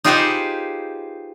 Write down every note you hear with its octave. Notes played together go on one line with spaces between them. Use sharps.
D#4 F4 G4 G#4 B4 C5